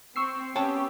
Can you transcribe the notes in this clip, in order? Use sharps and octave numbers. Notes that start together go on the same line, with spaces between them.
C4 C#6 E6 C7
B3 C#4 G4 C#5 G5 A5